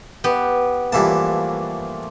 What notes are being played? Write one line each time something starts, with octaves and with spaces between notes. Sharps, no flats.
B3 G4
G2 E3 F3 A3 A#3 A5